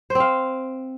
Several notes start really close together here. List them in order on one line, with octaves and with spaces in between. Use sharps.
C5 C4 F5